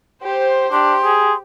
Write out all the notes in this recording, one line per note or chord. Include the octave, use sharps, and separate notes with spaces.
G4 C5
D4 G4 C6
G#4